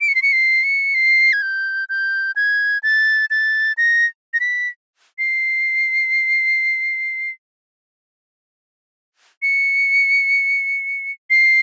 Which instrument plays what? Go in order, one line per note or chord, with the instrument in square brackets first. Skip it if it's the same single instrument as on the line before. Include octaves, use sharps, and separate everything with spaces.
[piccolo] D7
C#7
C7
C#7
C7
C#7
C7
G#6
G6
G6
G#6
A6
A6
A#6
A#6
B6
C7
C#7
C7